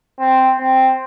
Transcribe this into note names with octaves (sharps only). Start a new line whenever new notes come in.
C4
C4